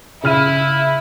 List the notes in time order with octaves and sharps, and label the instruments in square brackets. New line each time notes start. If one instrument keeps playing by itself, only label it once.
[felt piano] C#3 F6 D#7 [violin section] E4